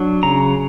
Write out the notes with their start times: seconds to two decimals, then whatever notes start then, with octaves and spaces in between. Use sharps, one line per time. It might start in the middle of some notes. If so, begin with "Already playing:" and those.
Already playing: F#3 D4
0.23 C#3 A#5